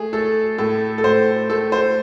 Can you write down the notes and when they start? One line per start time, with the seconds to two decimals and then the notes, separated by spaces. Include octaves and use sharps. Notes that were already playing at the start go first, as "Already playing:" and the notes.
Already playing: A3 G#4
0.13 A3 A4
0.58 A2 A4
0.98 A4
1.04 A2 C5
1.49 A3 A4
1.72 C5